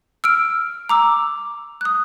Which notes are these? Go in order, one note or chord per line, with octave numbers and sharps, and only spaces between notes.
E6 F6 D7
A#5 D6 E6
D#6 F#6